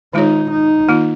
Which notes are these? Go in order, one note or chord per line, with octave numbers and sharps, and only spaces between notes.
D#3 G#3 D#4 F4 G#4 C#5
D#4
D#3 A#3 F4